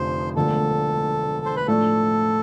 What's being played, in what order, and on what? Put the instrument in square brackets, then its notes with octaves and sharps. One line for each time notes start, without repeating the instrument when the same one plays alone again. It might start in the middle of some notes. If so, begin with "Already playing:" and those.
Already playing: [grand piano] F1 F2 D3 F3 [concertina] C5
[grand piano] E1 D2 D3 F3 [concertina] A4
[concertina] C5
B4
[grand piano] A2 F3 A3 D4 F4 [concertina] A4